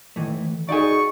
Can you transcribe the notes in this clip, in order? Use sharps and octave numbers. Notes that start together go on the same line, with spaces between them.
D#3 E3 A3
D#4 F#4 G#4 D5 G#5 C#6